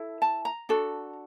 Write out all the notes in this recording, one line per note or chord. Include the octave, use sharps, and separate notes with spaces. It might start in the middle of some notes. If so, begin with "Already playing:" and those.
Already playing: E4 A4
A5
A#5
D4 F#4 A4